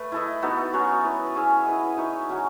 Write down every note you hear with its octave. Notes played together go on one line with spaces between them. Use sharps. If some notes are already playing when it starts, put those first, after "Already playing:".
Already playing: A3 B4
E4 A4 D#5
B3 D#4 F#4 A4
F#3 C#4 F#4 C#5
E4 B4 E5
C#4 G#4 C#5 E5
E4 B4 D#5
D#4 F#4 C#5 E5
F#3 C#4 F#4